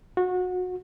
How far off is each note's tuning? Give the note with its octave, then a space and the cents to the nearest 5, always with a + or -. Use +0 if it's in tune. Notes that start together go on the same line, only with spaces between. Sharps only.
F#4 -25